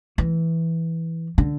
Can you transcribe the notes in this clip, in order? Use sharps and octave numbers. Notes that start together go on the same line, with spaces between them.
E3
D3